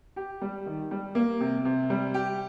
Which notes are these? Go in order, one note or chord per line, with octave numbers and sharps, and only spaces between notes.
G4
G3
D#3
G3
A#3
C3
C3
G3
G4